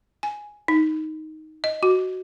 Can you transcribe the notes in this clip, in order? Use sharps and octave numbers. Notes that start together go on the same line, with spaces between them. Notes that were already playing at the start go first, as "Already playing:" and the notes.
G#5
D#4
D#5
F#4